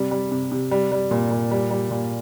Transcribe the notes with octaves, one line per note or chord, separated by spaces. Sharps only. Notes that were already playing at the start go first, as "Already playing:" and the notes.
Already playing: C3 G3
G3
C3
C3
G3
G3
A#2
A#2
G3
G3
A#2